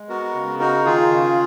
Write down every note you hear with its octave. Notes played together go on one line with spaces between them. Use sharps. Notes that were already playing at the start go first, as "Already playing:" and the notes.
Already playing: G#3
B3 F#4 A#4
C#3
D#4 F#4 A#4
D#3 F4 G#4
C#3